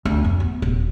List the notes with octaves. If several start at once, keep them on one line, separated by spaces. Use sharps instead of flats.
D2
F2
B3
D#1